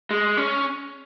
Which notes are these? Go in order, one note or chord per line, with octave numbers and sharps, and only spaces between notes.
G#3
C#4